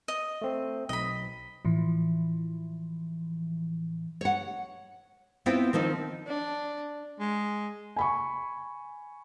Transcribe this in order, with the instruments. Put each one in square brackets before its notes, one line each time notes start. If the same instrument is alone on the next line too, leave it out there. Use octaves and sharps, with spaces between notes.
[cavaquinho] D#5
[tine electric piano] A3 C4
[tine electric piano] B1 [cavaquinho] D#5 B5
[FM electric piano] A2 E3 F3
[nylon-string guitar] C#5 F#5
B3 C4 E4 F4 C5 G5
D#3 F3 C4 D#4
[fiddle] D4
[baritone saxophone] G#3
[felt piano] G#5 B5 C#6